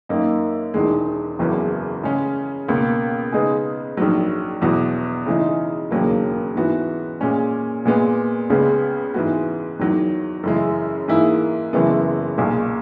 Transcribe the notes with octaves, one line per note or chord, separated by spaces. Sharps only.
F#2 D#3 A#3 D#4
E1 E2 D#3 G#3
F#1 E2 C#3 F#3 B3
C#3 G#3 C#4
C#2 B2 A#3
C#3 G#3 B3 D#4 G#4
A#1 G#2 D#3 F#3
E2 B2 F#3 B3 F#4
C#3 E3 G#3 D#4
E1 D#2 C#3 F#3 A#3
G#2 E3 B3 F#4
A#2 G#3 C#4
A#2 G#3 B3
C#2 C#3 G#3 B3
G#2 E3 G#3 B3 F#4
E2 D#3 F#3
F#2 C#3 E3 G#3
G#2 E3 A#3 E4 G#4
F#1 F#2 E3 G#3 B3
B1 A#2 G#3